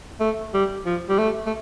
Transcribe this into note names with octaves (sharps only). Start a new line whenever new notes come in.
A3
G3
F3
G3
A3
A3